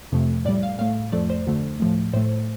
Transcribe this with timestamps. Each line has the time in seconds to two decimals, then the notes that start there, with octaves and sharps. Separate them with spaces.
0.12 F2 C3 F3 A3
0.45 A2 D5
0.49 G3
0.63 F5
0.79 A2 A3 F5
1.12 F2 F3 A3 D5
1.30 C5
1.47 D2 D3 A3
1.80 A2 F3 A3
2.13 A2 A3 C5